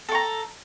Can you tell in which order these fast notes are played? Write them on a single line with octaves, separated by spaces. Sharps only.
A4 C#6 A#5